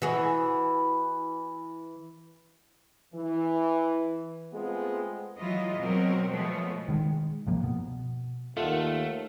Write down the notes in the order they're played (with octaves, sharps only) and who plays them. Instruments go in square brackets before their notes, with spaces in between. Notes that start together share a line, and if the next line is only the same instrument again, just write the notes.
[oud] E3 F#4 G#4
[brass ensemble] E3
G#3 A3 B3 C4 F4 G#4
[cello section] E3 F#3 G#3 E4 F4 D#5
B2 F#3 C4 A#4
B2 F3 G#3 A3 B3 C#5
[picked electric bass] D#3 G#3
C2 G2 F3 A#3
B2
[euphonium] D#2 [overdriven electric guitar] A3 [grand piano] F4 [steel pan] A4 D#5 F#5